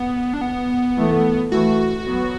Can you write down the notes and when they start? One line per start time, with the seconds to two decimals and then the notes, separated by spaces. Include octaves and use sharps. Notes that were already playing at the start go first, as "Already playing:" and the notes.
Already playing: B3
0.33 D4
0.41 B3
0.97 E3 A3
1.52 E3 A3 F#4
2.07 F#3 B3